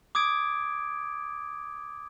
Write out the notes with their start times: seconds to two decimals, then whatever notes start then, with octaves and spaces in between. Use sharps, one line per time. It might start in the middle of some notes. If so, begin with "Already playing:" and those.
0.15 D6 D#6 G#6 D7